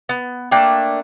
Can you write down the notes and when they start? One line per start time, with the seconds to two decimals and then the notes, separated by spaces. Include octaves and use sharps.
0.09 B3
0.51 A3 A#3 D4 G5